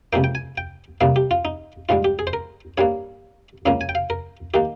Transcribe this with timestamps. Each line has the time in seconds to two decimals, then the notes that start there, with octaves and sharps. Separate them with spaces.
0.13 C#2 C3 F3 A#3 G5
0.24 G5
0.35 G#5
0.58 G5
1.01 C2 C3 G3 A#3 F5
1.16 G4
1.31 F4
1.45 D#4
1.89 A#1 G#2 G3 F4
2.04 G4
2.19 G#4
2.27 C5
2.33 A#4
2.78 G2 G3 A#3 C#5
3.66 C#2 C#3 F3 A#3 F5
3.81 G#5
3.89 G5
3.95 F5
4.10 A#4
4.54 D#3 A#3 G4